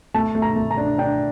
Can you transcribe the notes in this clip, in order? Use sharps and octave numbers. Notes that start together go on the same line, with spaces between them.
A3 A5
A3
A#5
A3
A#5
D4
D4 G5